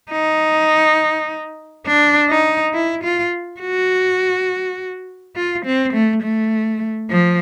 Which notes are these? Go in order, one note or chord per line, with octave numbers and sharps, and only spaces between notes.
D#4
D4
D#4
E4
F4
F#4
F4
C4
A3
A3
F3